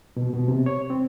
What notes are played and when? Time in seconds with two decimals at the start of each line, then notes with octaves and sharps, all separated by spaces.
0.17 B2
0.34 B2
0.48 C3
0.66 C#5
0.90 C4